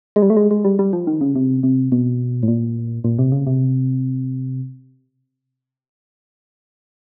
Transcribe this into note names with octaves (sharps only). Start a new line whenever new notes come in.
G#3
G3
A3
G#3
G#3
G3
G3
F3
D#3
C#3
C3
C3
B2
A2
A#2
A#2
C3
C#3
C3